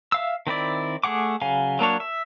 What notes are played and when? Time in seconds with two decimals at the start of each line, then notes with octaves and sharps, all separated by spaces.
0.12 E5 F5 E6
0.47 D#3 C4 E4 D5
1.04 A3 G#4 F#5 D6
1.42 C#3 F#3 F5 G#5
1.79 F#3 A#3 D4 C#5
2.00 E5